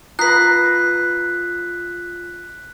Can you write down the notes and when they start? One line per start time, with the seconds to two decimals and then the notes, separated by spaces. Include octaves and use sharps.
0.19 F4 B4 A#5 D#6 F#6 B6 C7